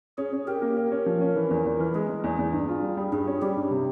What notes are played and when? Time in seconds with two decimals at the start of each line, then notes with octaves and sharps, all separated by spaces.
0.18 C#4 G#4
0.33 C#4
0.47 G4 A#4
0.62 A#3
0.77 G4
0.92 C#4
1.06 F3
1.21 C#4
1.36 E3
1.51 E2
1.66 E2
1.80 E3
1.95 G#3 G#4
2.09 G#3
2.24 E2
2.39 E2
2.53 G2
2.68 F4
2.83 G3
2.97 G3
3.12 G2 G#4
3.27 C#4
3.42 G3 G4
3.57 G2
3.71 C3